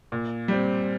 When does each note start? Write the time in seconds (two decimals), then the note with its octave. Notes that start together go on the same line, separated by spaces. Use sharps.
0.12 A#2
0.48 G3 C4